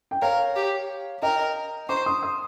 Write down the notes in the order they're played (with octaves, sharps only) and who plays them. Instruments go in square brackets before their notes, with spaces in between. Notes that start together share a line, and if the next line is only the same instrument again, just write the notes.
[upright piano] G5
[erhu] A#4 [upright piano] C#5 F5
[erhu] G4
[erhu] A#4 [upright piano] D#5 G5
[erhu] C5 [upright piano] A#5 C#6
[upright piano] C6 D#6
C6 D#6